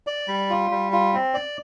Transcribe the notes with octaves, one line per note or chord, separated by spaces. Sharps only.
D5
G3
F4
G3
F4
C4
D5